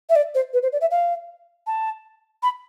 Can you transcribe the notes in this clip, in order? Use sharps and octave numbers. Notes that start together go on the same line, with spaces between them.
E5
D5
C5
B4
C5
D5
E5
F5
A5
B5